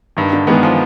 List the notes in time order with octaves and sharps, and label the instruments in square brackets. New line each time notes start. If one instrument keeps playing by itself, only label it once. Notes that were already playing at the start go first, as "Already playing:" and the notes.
[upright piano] G2 [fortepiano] D#3
[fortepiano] D3
[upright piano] D#3 G#3 B3 [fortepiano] E3
[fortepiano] F3